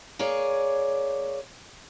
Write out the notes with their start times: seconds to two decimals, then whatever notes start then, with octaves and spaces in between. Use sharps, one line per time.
0.19 A#3 G#4 C#5 D5